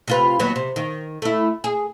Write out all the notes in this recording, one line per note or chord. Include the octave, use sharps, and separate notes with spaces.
C3 F4 B4
D#2 F#3 B3
C3
D#3
A3 E4
G#4